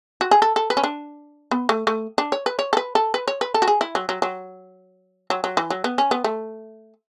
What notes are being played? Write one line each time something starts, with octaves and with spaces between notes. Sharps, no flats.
F#4
G#4
A4
A4
B4
C#4
D4
B3
A3
A3
D4
C#5
B4
C#5
A4
B4
A4
B4
C#5
B4
A4
F#4
G#4
E4
F#3
F#3
F#3
F#3
F#3
E3
F#3
B3
C#4
B3
A3